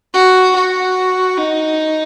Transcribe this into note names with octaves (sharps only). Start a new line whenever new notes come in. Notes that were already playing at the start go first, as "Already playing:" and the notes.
F#4
F#4
D#4